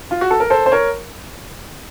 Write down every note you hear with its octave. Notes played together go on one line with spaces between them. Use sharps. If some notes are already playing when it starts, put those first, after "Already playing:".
F4
F#4
A4
A#4
A4 C5
C5
A#4 C#5